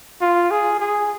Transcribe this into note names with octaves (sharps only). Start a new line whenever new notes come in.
F4
G#4
G#4